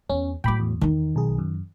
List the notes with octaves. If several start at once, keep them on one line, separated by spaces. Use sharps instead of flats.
E2 C#4
A2 F#3 G5 B5 D6
E2
D#3 D#4
B1 G#4
F#2